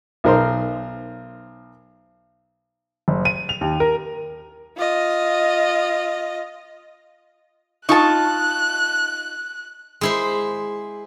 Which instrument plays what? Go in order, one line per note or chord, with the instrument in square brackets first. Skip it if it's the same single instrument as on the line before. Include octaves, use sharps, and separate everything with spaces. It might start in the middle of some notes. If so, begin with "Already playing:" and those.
[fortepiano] B1 D#4 A#4 C5 C6
[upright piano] F#1
D#7
F7
D#2
A#4
[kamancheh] F4 D#5
[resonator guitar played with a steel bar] D#4 F4 [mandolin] A5 C#6 [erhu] F#6
[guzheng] G#3 E4 C5